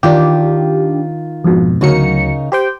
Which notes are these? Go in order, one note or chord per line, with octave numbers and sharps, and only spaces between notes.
D#3 D4 F4 G4
F2 G#2 B2
D2 C#3 F#3 D#4 A#4 C#7
G4 C5 G5